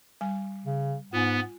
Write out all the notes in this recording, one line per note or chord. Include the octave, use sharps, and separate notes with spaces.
G3 G#5
C#3
G#2 B3 F4 G#5